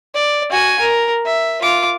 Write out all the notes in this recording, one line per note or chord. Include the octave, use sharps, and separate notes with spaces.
D5
F#4 G#5
A#4
E5
F4 D6